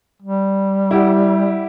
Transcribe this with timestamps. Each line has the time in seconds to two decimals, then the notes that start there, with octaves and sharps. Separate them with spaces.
0.22 G3
0.91 E4 G4 F#5